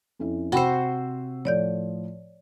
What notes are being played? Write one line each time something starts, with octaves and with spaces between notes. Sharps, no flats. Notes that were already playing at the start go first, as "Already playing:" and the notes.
F2 C#4 E4
C3 F#4 C5 G5 B5 E6
A2 F3 C#5 D5 G6